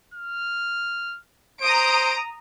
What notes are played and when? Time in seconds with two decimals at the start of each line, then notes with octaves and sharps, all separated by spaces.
0.14 F6
1.62 C5 A#5 D#6 D7